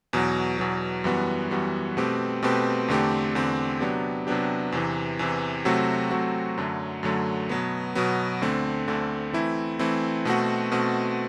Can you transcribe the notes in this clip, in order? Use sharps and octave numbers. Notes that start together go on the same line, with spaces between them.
E2 B2 F#3
E2 B2 F#3
F#2 E3 G3 B3 F#4
F#2 E3 G3 B3 F#4
B2 A3 C4 G4 B4
B2 A3 C4 G4 B4
E2 D3 A3 C4 G4
E2 D3 A3 C4 G4
C3 F#3 B3 D4 G4
C3 F#3 B3 D4 G4
E2 C3 E3
E2 C3 E3
C3 F#3 A3 C4 F#4
C3 F#3 A3 C4 F#4
F#2 D3 F#3 A3
F#2 D3 F#3 A3
B2 F#3 B3
B2 F#3 B3
D2 D3 A3 C4
D2 D3 A3 C4
E3 A3 C4 E4
E3 A3 C4 E4
B2 A3 C4 F#4
B2 A3 C4 F#4